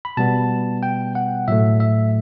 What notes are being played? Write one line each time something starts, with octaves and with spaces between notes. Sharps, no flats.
B5
B2 G3 B3 A5
G5
F#5
A2 F#3 A3 E5
E5